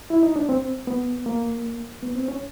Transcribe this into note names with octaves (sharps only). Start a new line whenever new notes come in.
E4
D#4
D4
C4
B3
A#3
B3
C4
C#4